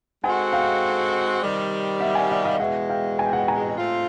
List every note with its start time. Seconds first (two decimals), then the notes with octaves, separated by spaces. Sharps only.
0.24 G#3 C4 D#4 F#4 A4 F#5 G#5
0.53 F5 G5
1.42 C3 D#3 G3
2.00 E5 F#5
2.15 F#5 G#5
2.30 E5 F#5
2.45 D#5 F5
2.59 E2 B2 G#3 E5 F#5
2.89 F5 G5
3.19 G#5
3.25 G5
3.33 F#5 G#5
3.48 G#5 A#5
3.77 A3 C4 F4